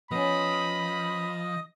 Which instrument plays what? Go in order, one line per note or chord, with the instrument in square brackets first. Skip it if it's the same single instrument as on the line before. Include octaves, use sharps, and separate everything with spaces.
[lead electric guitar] F3 [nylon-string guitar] B3 C#4 [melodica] D#5 D#6 [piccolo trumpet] B5